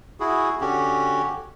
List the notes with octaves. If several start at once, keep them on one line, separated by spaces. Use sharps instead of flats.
E4 F#4 G#4
D3 C#4 F#4 G4